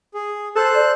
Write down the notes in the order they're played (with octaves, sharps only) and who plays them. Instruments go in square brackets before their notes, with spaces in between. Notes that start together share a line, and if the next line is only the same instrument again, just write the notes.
[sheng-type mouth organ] G#4
[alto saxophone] A4 [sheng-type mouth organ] C5 F#6
[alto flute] D5